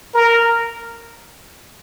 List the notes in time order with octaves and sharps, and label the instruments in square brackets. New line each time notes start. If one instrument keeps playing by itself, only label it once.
[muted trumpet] A#4